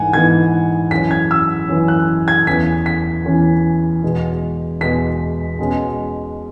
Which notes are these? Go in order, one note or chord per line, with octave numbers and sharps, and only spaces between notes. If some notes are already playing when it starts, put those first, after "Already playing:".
Already playing: G#2 E3 F#5 G#5
G#2 E3 B3 G#6
F#2 E3 C#4 B6
G#6
E6
F#2 E3 C#4
F#6
G#6
E2 E3 C#4 B6
B6
E2 E3 C#4
E2 B2 G#3
E2 B2 G#3 B6
B2 G#3 C#4